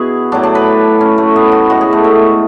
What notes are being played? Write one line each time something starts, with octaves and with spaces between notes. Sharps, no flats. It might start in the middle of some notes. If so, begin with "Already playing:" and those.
Already playing: B2 E4 F#4 G#4
A2 F#3 D4
D4
B4
C#4
A3
B3
F#4
A2 G#3 F#4
G#4
A3
A3